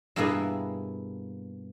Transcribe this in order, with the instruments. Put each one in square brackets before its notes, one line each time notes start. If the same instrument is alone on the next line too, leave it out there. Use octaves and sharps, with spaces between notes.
[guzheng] G2 B2 A#3 E4 G#4 G#5